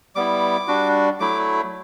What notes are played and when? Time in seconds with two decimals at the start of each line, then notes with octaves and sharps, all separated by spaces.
0.15 G3 B3 E4 D6
0.68 G3 D4 F#4
1.20 F#3 A3 E4 D6